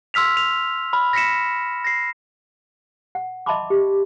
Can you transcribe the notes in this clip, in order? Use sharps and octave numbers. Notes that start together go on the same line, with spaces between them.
C6 E6 F6 B6 F7
F7
B5 F6
A#6 B6 C#7 E7
A#6 C7
F#5
D#5 E5 A5 B5 C6 D6
G4